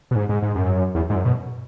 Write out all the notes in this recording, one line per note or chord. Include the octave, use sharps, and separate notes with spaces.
B2
G#2
G#2
G#2
F#2
E2
G#2
F#2
B2